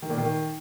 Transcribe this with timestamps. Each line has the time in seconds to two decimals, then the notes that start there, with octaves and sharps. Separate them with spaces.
0.02 D#3
0.10 A#2
0.18 D#3